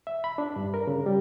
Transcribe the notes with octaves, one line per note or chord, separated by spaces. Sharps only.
E5
B5
D4
G2
A#4
C#3
G3